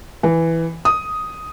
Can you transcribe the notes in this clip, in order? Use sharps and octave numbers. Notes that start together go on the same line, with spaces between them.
E3
D#6